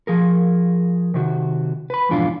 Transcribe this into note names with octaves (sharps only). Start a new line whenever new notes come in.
F3 G#4 A#4
C3 D#3 F#4
B4 B5
F2 G#2 B2 E3 D4 F4